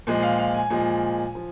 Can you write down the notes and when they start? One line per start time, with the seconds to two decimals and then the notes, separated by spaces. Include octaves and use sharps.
0.07 A#2 F3 G#3
0.23 F5
0.38 F5
0.54 G#5
0.70 A#2 F3 G#3
1.35 F3